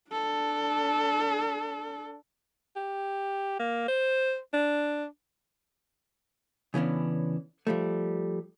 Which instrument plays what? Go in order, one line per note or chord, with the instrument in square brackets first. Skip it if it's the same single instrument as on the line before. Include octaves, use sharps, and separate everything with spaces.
[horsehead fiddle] D4 A4
[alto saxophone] G4
A#3
C5
D4
[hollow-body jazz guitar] C#3 E3 B3 C#4 D4
F3 G3 A3